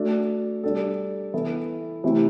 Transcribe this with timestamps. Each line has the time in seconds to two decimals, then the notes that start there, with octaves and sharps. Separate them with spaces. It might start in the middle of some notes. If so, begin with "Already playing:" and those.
Already playing: A3 D4 F#4 A4
0.63 G3 D4 A4
1.34 E3 B3 E4 A4
2.04 C3 E3 A3 E4 G4